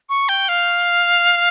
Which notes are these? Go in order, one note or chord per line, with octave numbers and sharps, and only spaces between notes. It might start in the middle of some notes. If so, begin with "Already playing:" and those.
C#6
G5
F5